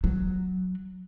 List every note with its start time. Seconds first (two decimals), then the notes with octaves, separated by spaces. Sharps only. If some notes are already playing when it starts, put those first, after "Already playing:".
0.04 F#3